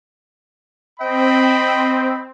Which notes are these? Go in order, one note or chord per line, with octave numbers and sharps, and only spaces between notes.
C4 D#5 G5 B5